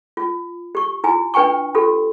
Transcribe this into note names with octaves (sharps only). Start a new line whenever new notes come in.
F4
G4 C#6
E4 F4 G#5
D4 B4 G5 G#5 C#6
F4 G4 A4